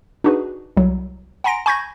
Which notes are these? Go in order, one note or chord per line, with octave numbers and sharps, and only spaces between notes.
D4 D#4 F#4 G#4 B4
C2 F#3
F#5 G#5 A#5 C6 A#6 D7
G#5 B5 C#6 G6 G#6 A#6